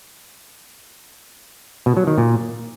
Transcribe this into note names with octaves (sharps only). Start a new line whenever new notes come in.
B2
F#3
D#3
A#2